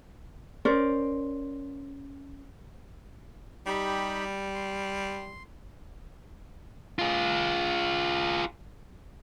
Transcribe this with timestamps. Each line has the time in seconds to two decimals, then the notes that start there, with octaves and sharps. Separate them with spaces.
0.65 C#4 A#4 C5 D5
3.67 G3 D#4 G4 B5
4.54 C6
6.99 F4 G#4